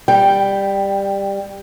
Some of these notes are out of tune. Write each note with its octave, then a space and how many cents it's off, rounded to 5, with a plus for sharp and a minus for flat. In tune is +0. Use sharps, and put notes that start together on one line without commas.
G3 +15 G5 +0